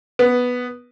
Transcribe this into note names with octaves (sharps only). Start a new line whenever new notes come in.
B3